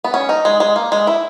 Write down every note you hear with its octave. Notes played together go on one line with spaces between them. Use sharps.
B3
C#4
D#4
G#3
G#3
A#3
G#3
E4